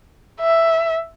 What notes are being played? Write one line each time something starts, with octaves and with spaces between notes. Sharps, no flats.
E5